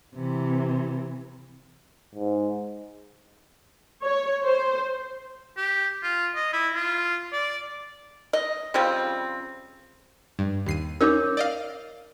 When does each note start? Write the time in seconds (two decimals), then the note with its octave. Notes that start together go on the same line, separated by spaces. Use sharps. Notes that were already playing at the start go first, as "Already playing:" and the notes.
0.15 C3 E3
2.15 G#2
4.03 C#5
4.43 C5
5.57 G4
6.03 F4
6.35 D#5
6.53 E4
6.74 F4
7.33 D5
8.33 D#5
8.74 C#3 F3 G3 C4
10.39 G2
10.66 D#2 C7 D#7
11.01 C#4 D#4 A#4 C#5 D6
11.37 D5 D#5 F5